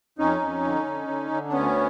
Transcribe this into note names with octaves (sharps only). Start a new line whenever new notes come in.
F2 C#4 D#4
F2
D3
D3
D3
D3
D4
D2 B3 C#4